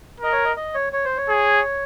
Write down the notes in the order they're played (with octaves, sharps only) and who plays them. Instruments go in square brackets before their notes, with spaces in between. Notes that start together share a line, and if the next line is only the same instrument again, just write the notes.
[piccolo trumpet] A#4 [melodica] D#5
[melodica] C#5
D#5
D#5
C#5
C#5
C5
C#5
[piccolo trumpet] G#4